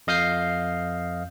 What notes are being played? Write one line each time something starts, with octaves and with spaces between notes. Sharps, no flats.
F2 D#5 F5 D#6 G6 C7